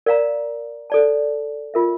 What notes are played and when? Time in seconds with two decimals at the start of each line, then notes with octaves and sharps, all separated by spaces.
0.06 A#4 D5 F5 A#5
0.90 A4 D5 A5
1.74 F4 A#4 E5